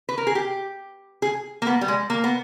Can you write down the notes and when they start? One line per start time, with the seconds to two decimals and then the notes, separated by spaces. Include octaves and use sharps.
0.09 B4
0.18 A#4
0.27 G#4
0.35 G4
1.22 G#4
1.62 A#3
1.67 B3
1.81 G3
1.88 G#3
2.10 A#3
2.24 B3